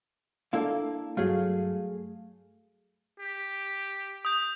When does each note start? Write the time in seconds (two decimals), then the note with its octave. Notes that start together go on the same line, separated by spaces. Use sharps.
0.53 A#3 D4 E4 A4 F5
1.17 G2 F#3 A3 G#4 F5
3.20 G4
4.25 D#6 G6